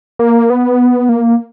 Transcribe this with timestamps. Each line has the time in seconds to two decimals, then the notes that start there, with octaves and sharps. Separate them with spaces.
0.19 A#3
0.50 B3
1.09 A#3